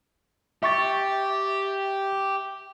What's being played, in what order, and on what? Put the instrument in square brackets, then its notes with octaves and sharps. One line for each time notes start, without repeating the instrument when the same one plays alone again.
[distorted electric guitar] G4 [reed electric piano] E5 C#6 A6